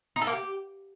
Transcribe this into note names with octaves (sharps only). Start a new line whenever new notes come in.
D#4
A4
A#3
G4